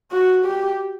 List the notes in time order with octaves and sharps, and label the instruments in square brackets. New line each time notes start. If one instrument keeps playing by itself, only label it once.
[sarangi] F#4
G4